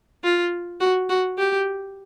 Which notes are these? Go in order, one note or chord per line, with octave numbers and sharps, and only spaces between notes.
F4
F#4
F#4
G4